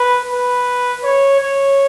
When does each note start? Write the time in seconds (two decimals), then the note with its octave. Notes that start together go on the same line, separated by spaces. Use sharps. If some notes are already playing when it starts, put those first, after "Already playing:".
Already playing: B4
0.33 B4
1.03 C#5
1.40 C#5